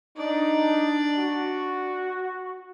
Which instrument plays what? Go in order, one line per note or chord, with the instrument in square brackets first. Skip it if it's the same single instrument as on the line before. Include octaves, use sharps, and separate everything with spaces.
[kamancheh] D4 D5 [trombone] D#4
[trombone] F#4